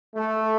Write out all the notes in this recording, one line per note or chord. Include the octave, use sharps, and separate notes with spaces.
A3